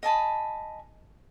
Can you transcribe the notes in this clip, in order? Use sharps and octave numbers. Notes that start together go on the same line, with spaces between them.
D#5 G#5 A5 B5